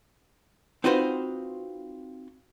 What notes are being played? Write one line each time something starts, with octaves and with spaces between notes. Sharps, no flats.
C4 D#4 F4 F#4 B4 C5